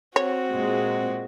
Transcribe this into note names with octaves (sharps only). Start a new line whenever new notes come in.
C4 F#4 C#5
A#2 G#3